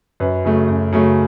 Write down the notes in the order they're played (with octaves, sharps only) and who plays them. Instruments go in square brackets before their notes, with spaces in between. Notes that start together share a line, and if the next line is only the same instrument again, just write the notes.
[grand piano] F#2 B4
C#3 F#3 A3
F#2
C#3 F#3 A3